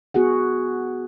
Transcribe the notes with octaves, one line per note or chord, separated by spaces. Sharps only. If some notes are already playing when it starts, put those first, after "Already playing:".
B3 F#4 G#4 F#5